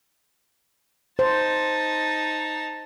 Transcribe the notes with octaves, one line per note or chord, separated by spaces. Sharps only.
D#4 C5 A5